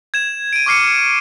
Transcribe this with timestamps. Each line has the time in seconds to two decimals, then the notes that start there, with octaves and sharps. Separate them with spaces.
0.14 G#6 E7
0.53 D7 D#7
0.66 C#6 D6 F6 C7 C#7 D#7